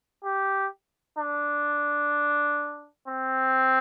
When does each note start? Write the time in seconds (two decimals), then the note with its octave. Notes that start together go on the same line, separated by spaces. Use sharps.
0.25 G4
1.19 D4
3.08 C4